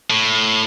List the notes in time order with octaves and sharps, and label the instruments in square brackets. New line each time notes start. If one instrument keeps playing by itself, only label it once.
[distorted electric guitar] A2